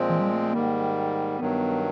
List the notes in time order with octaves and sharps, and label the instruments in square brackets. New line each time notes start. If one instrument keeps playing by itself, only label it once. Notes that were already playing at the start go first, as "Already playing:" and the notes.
Already playing: [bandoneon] A#2 F3 G#3 C4
[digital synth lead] E3
G3
A3
A3
[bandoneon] G#2 D#3 G3 [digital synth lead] A#3
[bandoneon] G2 D#3 F#3 [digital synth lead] B3